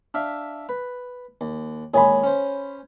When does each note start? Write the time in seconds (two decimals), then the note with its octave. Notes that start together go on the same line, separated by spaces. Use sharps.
0.14 D4 E5 F5
0.69 B4
1.41 D#2
1.94 D#2 G#3 G#4 C#5 G#5 B5
2.23 C#4 C5